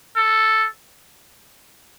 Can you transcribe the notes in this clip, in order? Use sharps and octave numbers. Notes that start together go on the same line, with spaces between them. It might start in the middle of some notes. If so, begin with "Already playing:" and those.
A4